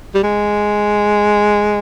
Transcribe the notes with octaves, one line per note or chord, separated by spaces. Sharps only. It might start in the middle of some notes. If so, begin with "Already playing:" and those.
G3
G#3